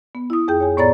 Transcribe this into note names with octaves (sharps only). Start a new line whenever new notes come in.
B3
E4 D#6
F2 G#4 G5 G6
C#5 G#5
A2 B3 C#5 D5 A#5 A6